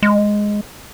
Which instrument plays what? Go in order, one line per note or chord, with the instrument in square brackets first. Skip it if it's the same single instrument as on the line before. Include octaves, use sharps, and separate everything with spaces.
[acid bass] G#3